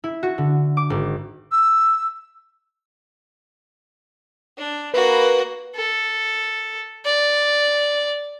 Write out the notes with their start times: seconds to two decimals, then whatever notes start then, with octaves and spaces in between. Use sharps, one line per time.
0.04 E4
0.23 F#4
0.38 D3
0.77 D6
0.90 G#1
1.51 E6
4.58 D4
4.94 A#3 F#4 B4
5.75 A4
7.05 D5